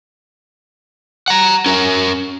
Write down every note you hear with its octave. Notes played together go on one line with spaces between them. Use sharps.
F#5 A#5
C#4 A#4